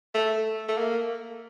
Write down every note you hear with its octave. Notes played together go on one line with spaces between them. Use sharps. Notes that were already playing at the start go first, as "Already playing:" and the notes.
A3
A3
A#3